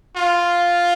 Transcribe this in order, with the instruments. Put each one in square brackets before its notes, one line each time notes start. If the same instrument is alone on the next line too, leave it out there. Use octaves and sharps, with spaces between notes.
[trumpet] F4